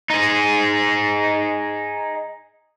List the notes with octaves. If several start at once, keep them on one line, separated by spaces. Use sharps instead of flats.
D#4 G#4